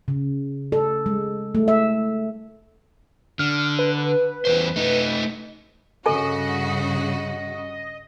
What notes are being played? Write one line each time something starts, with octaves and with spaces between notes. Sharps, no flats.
C#3
A4
G#3
A3
E5
D3 F6
B4
E2 D#3 C5
A3 D#4
G2 C#3 F#4 A4 D#5 G#5